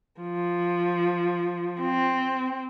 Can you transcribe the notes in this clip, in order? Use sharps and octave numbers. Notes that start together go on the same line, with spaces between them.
F3
C4